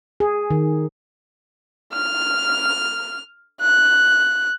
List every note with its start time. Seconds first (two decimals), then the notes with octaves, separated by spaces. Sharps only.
0.20 G#4
0.50 D#3
1.93 F6
3.61 F#6